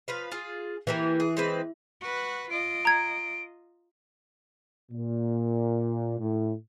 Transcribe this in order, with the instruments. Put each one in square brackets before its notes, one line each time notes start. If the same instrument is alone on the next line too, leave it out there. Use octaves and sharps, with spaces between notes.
[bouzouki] F3 B4 F5
F4 G#4
[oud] E3 [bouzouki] A#3 G4 G#5
[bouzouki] G#4
G#3 C4 B4
[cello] F#4 B4
[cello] F4 D#5 [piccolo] D7
[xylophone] A#5 G#6
[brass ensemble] A#2
A2